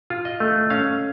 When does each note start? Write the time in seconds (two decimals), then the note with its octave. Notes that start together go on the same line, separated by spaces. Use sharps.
0.10 F4
0.25 D#5
0.40 A3
0.70 C#4 F5